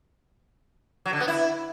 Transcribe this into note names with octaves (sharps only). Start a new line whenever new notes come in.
F#3
D3
B3
E4